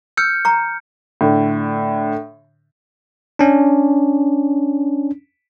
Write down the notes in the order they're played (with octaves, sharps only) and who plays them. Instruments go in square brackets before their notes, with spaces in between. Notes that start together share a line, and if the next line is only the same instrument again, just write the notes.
[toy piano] E6 [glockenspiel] F6 G6 C#7
[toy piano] A#5 C#6
[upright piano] A2 D3
[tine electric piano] C#4 D4